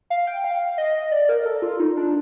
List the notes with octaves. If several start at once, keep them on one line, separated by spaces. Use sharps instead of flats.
F5
G5
F5
D#5
D5
A#4
A4
F4
D#4
D4